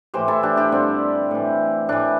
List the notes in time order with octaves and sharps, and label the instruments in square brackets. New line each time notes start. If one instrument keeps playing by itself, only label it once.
[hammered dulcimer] A2 E3 G4 C5
E4 A4
D4 G4
D4 G4
G2 D3 C4
A2 E3
A2 E3 D4